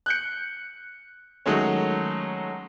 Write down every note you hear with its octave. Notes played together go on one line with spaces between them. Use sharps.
F#6 G6 C#7
D#3 F#3 G#3 A3 C#4